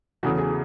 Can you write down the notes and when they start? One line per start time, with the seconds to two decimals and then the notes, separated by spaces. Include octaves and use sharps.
0.23 E2 C#3 E3 A3 F#4
0.38 G#4